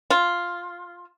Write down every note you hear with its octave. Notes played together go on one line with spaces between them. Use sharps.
F4